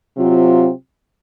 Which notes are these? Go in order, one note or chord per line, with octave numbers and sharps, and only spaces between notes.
C3 F#3 C4 F4